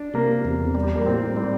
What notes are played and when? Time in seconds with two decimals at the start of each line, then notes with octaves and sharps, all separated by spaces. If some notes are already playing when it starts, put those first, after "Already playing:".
Already playing: D4
0.14 C3 A#3
0.45 E2
0.75 G3
0.95 A#3
1.06 A2 C4
1.36 G3 C4